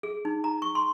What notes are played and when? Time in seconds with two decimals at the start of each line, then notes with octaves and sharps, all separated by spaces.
0.03 G#4
0.25 D#4
0.44 A#5
0.62 C#6
0.75 C6